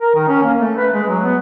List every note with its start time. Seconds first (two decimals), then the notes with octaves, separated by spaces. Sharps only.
0.01 A#4
0.15 D#3
0.28 C#4
0.43 A#3
0.59 A3
0.77 B4
0.92 G#3
1.09 F#3
1.24 B3